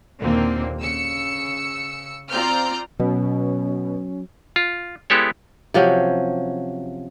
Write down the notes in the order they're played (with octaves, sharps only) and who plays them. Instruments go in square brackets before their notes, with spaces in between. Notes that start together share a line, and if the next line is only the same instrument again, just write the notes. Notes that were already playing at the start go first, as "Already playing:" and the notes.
[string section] D#2 A#2 D3 A#3 C4
C#3 E6 C#7
C4 F4 D5 A#5 F6 G6
[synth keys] B2 [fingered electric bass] F#3 [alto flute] C#4
[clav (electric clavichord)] F4
G#3 B3 E4 G4 A4 C#5
[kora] C3 F3 F#3 C#4